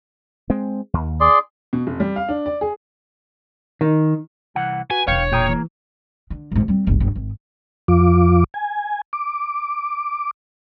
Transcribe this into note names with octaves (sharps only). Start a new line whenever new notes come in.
G#3 C4
D#2
G#4 D5 C6
B2
F1
G3
F5
D4
D5
G#4
D#3
C2 E3 F#5
F#4 B4 G#5
E1 D3 C#5 F5 G5 C#7
A#2 A#3 G#4 G5 D#6
E3
D3
G#1 G#2
G3 C4
F#1 C2
G1
G#1
F2 F3 F4 D6
G#5
D6